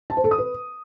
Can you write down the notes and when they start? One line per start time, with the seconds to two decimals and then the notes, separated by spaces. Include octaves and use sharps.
0.10 A5
0.17 C5
0.24 A4
0.31 D#6
0.38 B4